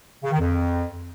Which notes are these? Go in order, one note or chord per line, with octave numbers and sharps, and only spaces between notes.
C#3
D#3
F2